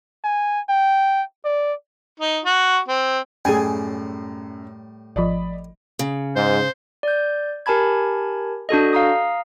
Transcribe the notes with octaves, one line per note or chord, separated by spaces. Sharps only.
G#5
G5
D5
D#4
F#4
C4
F#2 A2 G3 G#4 G5 G#5
G#1 F3 D5 D#5 B5
C#3
G#2 C5
D5 G6
G4 A#4 G#5 A5 B5 G#6
D4 F#4 A4 D#5
F5 A#5 D#6